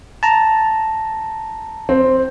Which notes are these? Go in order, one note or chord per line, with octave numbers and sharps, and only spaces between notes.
A5 A#5
C4